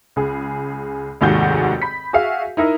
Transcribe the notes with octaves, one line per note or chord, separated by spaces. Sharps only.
C#2 G#4
F1 D#2 G#2 F#4 G#4 G6
B5 B6
F#4 G#4 E5 F5
D#4 E4 A#4 D#5